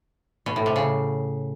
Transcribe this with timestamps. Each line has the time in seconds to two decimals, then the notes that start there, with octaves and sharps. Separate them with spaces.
0.46 B2
0.56 A2
0.66 C3
0.76 C#3